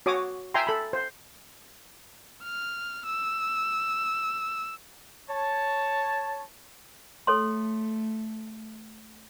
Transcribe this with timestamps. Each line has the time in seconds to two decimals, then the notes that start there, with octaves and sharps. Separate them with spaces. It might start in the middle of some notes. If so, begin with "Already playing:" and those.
0.06 F#4 C#5 D6 D#6
0.54 E5 G5 G#5 A#5 C6
0.67 A4 B5
0.93 C5
2.44 F6
3.06 E6
5.30 C#5 A5
7.27 A3 A4 C#5 C6